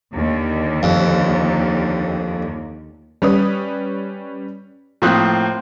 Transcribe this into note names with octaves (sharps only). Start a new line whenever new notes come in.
D#2 D3
F2
G3 C#4 B4 D#6
A2 F3 A#3 C4 D#6 F#6